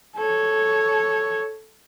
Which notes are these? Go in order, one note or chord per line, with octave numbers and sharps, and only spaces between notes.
A4 C#5